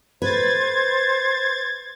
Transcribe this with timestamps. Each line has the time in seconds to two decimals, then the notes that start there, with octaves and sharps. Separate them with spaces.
0.22 B4 C5 G#6 A6